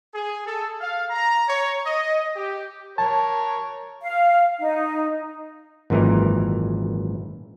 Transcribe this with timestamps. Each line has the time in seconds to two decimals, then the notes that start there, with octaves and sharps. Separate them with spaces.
0.14 G#4
0.45 A4
0.80 F5
1.10 A#5
1.48 C#5
1.84 D#5
2.36 G4
2.98 A#4 C#5 A5
4.00 F5
4.60 D#4
5.90 G#1 F#2 A#2 E3 D#4 A#4